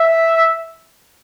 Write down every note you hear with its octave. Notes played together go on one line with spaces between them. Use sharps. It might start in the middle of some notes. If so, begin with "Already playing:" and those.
Already playing: E5